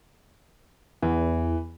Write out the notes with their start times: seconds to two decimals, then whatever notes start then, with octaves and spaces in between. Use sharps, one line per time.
1.02 E2 E3